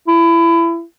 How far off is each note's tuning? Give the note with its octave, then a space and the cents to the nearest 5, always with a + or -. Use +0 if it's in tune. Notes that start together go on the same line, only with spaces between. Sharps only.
E4 +25